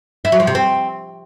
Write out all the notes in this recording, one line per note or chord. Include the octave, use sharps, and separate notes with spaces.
E4
F#3
F3
C3
C4